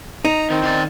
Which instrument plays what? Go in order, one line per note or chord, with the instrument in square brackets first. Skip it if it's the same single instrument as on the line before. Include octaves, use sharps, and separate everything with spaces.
[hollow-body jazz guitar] D#4 [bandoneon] A#5
[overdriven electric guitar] D#3 [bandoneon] C4
[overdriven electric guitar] D#3 D5